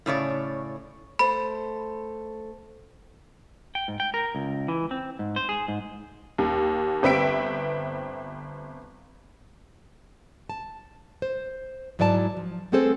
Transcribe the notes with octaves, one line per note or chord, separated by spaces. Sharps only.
A2 C#3 C#5 D5
A3 A4 C5 B5
G5
G#2
G5
A#4
C#2
E3
C4
G#2
C5
G#4
G#2
D#2
G1 C4 B4 E5 G5 D7
A5
C5
G#2 F#3 E4 D5 G5 A5
F3
A3 B3 C4 G#4 A4 C5